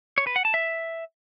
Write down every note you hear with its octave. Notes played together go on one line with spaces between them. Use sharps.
C#5
B4
F#5
A5
E5